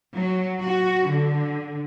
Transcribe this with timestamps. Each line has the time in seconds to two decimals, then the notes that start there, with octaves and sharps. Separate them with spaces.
0.14 F#3
0.62 F#4
1.08 D3